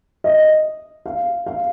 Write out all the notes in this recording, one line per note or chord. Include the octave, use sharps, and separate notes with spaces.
D#5
F5
F5